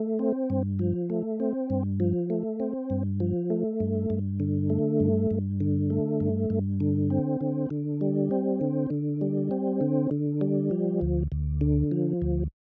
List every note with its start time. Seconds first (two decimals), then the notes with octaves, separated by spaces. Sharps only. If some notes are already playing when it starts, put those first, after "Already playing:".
Already playing: A3
0.19 C4
0.50 G2
0.79 F3
1.10 A3
1.40 C4
1.70 G2
2.00 F3
2.30 A3
2.60 C4
2.90 G2
3.20 F3
3.50 A3
3.80 G2
4.10 G2
4.40 D3
4.70 A3
5.00 G2
5.31 G2
5.60 D3
5.90 A3
6.20 G2
6.50 G2
6.80 D3
7.10 C4
7.41 D3
7.70 D3
8.01 G3
8.31 C4
8.61 D3
8.90 D3
9.21 G3
9.51 C4
9.81 D3
10.11 D3
10.41 G3
10.71 F3
11.01 D2
11.32 D2
11.61 D3
11.91 F3
12.22 D2